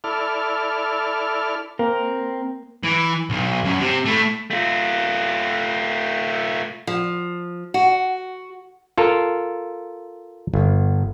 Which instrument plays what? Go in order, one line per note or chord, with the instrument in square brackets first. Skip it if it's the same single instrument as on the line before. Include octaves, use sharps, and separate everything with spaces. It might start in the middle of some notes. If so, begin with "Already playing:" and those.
[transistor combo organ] E4 A4 D5 F6
[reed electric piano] A#3 [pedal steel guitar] C4 A#4
[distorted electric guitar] E3
B1
F#2
C3
A3 E4
[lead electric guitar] A3 F4
[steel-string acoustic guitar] F3
F#4
[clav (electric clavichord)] F4 A4 A#4
G1